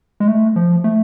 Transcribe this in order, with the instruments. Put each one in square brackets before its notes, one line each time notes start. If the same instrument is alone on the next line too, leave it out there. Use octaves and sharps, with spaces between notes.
[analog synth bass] G#3
A3
F3
A3